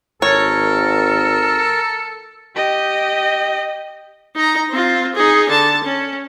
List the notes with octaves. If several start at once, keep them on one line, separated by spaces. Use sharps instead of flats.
G#1 A4 A#4 C#5
G4 D#5
D#4 A#5
C4 F4
D#4 G#4
D3 A5
C#4